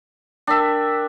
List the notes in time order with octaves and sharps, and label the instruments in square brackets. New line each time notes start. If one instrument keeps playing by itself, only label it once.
[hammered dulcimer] D4 E5 [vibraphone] A#4 G5